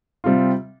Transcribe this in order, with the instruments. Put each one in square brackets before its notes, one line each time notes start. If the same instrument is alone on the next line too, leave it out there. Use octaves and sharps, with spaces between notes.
[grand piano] C3 G3 C4 F4